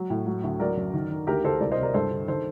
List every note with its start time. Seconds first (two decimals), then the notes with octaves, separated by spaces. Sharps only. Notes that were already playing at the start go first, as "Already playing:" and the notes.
Already playing: F#3
0.10 A2
0.26 F#3
0.44 D2
0.60 F#3 A#4 D5
0.77 F#2
0.93 D#3
1.10 D#3
1.27 D2 G4 A#4
1.44 D2 A4 C5
1.61 C2 A#4 D5
1.72 C5 D#5
1.77 C3
1.83 A#4 D5
1.94 G2 A4 C5
2.11 D3
2.28 D#3 A4 C5